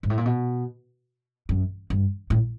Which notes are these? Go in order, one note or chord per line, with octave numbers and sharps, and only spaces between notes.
G#2
A2
A#2
B2
F#2
G2
A2